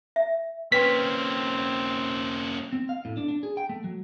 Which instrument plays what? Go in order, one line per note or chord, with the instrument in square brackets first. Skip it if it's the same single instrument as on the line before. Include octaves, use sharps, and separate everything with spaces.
[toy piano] E5
[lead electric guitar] A#3 C#4 [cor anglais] C4 [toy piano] B4 G5 C6 [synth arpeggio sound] B6
[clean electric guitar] C4
F5
A2
D4
D4
G#4
G5
A3
F#3